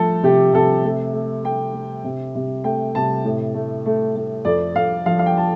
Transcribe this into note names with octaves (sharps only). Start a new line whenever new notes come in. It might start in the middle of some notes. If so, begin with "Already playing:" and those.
Already playing: F3 A3 A4
C3 G4
C3 A4
A3
A3
A3 G5
A3
C3
C3
A3 G5
C3 A5
A2
A3
A3
A3
F2 D5
F2 F5
F3 F5
F5
G5
A5